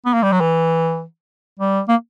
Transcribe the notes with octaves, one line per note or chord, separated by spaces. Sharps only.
B3
A#3
G3
F#3
E3
G3
A#3